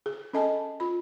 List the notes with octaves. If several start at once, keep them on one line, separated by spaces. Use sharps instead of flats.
G#4
C#4 A4 D#5 G#5 A5
F4 B5